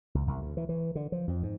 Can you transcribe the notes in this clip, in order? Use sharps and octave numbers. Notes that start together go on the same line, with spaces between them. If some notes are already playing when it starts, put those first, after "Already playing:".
C#2
C2
D2
E3
E3
D3
F3
F2
G#2